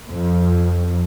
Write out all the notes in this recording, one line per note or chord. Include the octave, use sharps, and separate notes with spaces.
F2